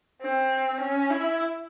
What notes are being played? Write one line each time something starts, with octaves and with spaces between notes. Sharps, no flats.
C4
C#4
E4